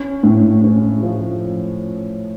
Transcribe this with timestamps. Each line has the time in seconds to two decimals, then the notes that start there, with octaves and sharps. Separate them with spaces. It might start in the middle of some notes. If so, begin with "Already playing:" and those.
Already playing: C#4
0.23 A2
0.64 C#4
1.02 F3